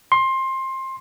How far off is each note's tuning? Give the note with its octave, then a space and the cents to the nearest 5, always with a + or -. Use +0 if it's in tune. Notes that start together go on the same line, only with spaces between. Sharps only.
C6 +20